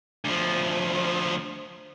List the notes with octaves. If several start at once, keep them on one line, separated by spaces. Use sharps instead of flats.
D2 F3